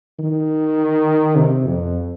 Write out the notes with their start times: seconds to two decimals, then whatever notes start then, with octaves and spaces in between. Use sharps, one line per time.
0.19 D#3
1.37 C3
1.66 F2